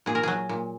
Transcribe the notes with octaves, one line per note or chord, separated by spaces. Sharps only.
A#2 G#4
A#4
F#3 G#4
A#2